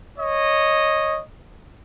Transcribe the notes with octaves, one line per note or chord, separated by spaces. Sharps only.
C#5 D#5